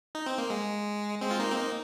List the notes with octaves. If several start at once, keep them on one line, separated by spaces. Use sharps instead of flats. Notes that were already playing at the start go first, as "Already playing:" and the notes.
D#4
C4
A#3
G#3
G#3 C4
F4
A#3 D#4
C4
A#3 D#4